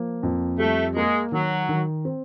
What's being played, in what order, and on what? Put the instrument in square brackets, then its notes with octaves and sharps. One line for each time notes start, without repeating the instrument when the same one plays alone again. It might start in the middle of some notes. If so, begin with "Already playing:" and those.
Already playing: [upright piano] F3 A#3
F2
[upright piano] G3 [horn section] A3
[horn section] G#3 [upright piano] A#3
[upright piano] D#3 [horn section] F#3
[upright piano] D#3
C4